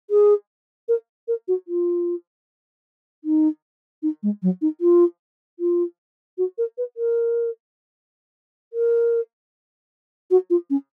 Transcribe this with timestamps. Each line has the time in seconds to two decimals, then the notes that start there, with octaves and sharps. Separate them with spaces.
0.10 G#4
0.88 A#4
1.28 A#4
1.48 F#4
1.68 F4
3.24 D#4
4.03 D#4
4.23 G#3
4.43 F#3
4.62 D#4
4.81 F4
5.59 F4
6.38 F#4
6.58 A#4
6.78 B4
6.97 A#4
8.73 A#4
10.31 F#4
10.50 F4
10.70 C#4